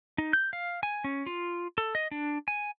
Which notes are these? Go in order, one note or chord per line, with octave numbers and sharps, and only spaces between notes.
D#4
G6
F5
G#5
C#4
F4
A4
D#5
D4
G#5